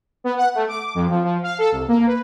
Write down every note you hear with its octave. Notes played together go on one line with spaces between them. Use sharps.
B3
F#5
A3
D6
F2
F3
F3
F5
A4
C2
A#3
B4